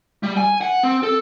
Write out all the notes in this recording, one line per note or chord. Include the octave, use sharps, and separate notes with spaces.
G3
G#5
F#5
C4
A4